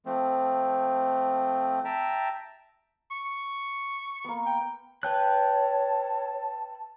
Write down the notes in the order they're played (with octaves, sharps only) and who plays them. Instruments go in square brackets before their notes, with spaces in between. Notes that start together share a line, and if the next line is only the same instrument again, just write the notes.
[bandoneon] F3 A3 C4
E5 G5 A5 A#5
[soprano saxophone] C#6
[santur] A#3 B3
[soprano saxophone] G5
[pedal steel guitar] B4 G5 F#6 [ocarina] C#5 [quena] A5